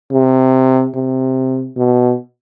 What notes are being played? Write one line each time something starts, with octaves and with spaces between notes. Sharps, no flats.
C3
C3
B2